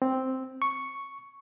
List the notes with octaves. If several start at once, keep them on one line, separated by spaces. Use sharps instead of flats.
C4
C#6